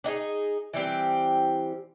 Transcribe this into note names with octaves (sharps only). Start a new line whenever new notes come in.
D4 D#4 G#4 D#5
E3 G3 C4 G4